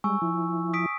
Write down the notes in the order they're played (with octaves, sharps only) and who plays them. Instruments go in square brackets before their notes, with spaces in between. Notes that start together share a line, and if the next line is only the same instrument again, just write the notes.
[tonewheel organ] G3 G#3 [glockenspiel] G#5 C#6 E6
[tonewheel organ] F3 E4
[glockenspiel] D#6 B6 D7